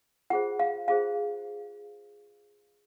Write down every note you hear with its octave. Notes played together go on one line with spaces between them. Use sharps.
F4 G#4 C5 F#5
F5
F4 G#4 C5 F5